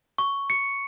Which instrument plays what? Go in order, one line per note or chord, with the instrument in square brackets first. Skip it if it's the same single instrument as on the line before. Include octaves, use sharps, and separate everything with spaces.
[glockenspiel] C#6
C#7